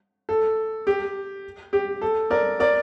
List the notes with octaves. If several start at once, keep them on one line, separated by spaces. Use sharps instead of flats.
A4
G4
G4
A4
A#4 D5
A#4 D5